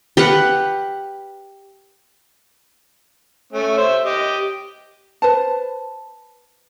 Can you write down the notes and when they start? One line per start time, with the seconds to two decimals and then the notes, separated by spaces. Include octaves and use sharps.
0.17 G4 B4 F5 F#5
3.53 A3 C#4
3.77 C5 E5
4.05 G4 D#5
5.22 B4 C5 A5